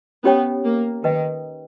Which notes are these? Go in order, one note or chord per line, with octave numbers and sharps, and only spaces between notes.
B3 C#4 G4 C#5 G5
A#3
D#3 B4 D#5 G5